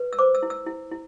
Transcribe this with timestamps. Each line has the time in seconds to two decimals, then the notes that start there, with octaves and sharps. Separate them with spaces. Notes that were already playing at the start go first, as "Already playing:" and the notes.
Already playing: B4
0.13 E6
0.19 C5 D6
0.35 E6
0.43 E4
0.50 E6
0.66 E4
0.92 E4